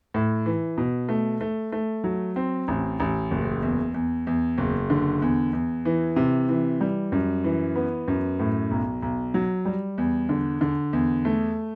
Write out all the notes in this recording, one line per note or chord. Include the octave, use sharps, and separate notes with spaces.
A2
E3
B2
A3
A3
A3
F#3
C4
A1
A1
F#1
E2
E2
E2
F#1
D3
E2
E2
E3
C3
E3
G3
F#2
E3
B3
F#2
A2
B1
B1
F#3
G3
E2
D3
D3
E2
A3